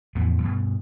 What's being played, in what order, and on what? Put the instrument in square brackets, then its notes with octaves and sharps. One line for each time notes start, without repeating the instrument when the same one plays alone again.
[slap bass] E2 A2 F3 B3
G2 B2